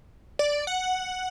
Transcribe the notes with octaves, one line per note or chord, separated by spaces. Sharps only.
D5
F#5